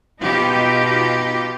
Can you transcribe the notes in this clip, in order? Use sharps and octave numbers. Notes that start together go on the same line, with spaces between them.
B2 D#4 F4 G4